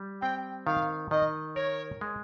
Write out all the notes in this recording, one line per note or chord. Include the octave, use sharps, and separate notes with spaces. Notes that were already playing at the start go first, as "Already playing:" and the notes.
Already playing: G3
C4 G5
D#3 F5
D#3 D#5
A#4 C#5
G#3